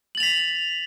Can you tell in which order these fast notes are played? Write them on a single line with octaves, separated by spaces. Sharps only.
F#7 A6 F7 B6